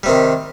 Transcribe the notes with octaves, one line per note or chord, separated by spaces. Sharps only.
C3 D#3 G3